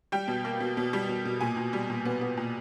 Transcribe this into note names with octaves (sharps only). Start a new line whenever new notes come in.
G3 G5
B2
A#3
B2
B2
G3
B2
B2
A#2 G#5
A#2
G3
A#2
B3
B3
A#2